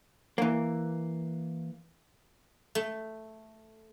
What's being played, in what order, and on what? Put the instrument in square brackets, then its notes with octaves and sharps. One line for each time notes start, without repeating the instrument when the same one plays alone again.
[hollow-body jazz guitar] E3 A#3
[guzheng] A3